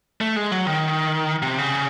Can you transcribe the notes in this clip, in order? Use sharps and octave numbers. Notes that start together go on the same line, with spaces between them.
A3
G#3
F#3
D#3
C3
C#3